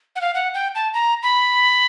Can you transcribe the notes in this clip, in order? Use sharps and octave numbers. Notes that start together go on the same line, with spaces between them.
F#5
F5
F#5
G5
A5
A#5
B5